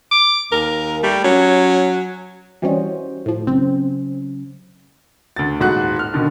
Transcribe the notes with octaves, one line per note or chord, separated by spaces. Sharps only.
D6
D#2 A#4
G3 A3
F#3 C#4
E3 G3 C#4 F#4 C5 D#5
A2 F3
C#3 F#3 C4 C#4
D2 A6
D#1 G#2 F#4 F#6
F6
B2 D3 D#3